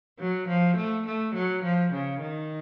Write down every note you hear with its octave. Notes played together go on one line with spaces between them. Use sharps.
F#3
F3
A3
A3
F#3
F3
C#3
D#3